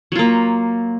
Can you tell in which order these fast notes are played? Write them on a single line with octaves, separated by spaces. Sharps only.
F#3 F4 A#3